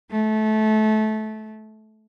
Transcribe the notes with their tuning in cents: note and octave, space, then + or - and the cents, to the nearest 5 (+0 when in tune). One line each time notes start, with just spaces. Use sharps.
A3 -25